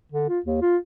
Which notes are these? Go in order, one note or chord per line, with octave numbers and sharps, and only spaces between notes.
D3
F4
D#2
F4